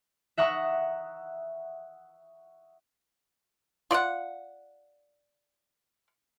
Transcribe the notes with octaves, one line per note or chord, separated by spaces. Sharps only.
E5 F#5 A#5 C#6 D#6
F4 D5 F5 F#5